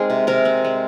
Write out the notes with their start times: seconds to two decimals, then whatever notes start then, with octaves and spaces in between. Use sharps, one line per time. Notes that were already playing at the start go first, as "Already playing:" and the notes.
Already playing: G#3 C4 D#4 G#4 A#4 C5
0.10 C3
0.27 C3 A#4
0.45 C4
0.65 G#3